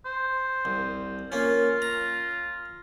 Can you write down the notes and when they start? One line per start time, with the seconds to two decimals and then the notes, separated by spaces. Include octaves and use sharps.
0.06 C5
0.65 C2
1.32 A#3 C#4 F4
1.82 A#5